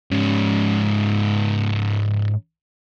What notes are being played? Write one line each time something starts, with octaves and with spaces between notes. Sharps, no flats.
G#2 C#4